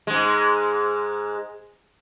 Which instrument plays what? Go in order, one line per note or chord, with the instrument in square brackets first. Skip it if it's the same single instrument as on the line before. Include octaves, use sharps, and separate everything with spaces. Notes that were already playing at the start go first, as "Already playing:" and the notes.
[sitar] G#2 G#3